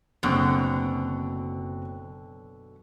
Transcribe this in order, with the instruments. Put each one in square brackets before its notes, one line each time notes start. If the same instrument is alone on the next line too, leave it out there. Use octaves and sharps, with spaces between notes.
[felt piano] F#1 C4 [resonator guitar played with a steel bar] F#2 B2 D3